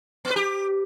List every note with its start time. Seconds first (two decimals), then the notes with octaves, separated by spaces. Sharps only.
0.25 B3
0.30 B4
0.36 G4